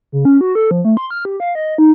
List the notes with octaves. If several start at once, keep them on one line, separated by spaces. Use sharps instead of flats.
C#3
C#4
F#4
A4
F3
A3
C6
F6
G4
F5
D#5
D#4